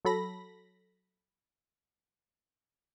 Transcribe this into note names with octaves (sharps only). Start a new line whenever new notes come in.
F#3 A4 B5 A#6